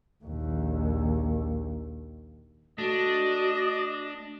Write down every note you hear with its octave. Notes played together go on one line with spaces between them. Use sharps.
A#1 D#2
A3 D4 F#4 D#5